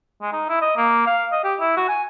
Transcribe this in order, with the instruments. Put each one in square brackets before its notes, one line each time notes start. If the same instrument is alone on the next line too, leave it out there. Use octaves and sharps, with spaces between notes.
[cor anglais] G#3
D#4
E4
D#5
A#3
F5
D#5
G4
E4
F#4
G#5